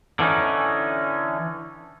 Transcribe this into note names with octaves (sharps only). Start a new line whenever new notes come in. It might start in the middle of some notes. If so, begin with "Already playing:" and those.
D3 E3 C#4 D#4